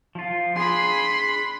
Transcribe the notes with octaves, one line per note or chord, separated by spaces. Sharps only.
F3 F4
D4 G#4 B5 C6